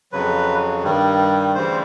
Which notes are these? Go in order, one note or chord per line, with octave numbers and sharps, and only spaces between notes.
F2 C#3 F#3 B4
G2 D#3 G3
D2 C#3 E3 G3 C5